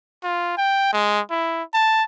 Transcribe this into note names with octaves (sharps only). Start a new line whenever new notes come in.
F4
G5
G#3
E4
A5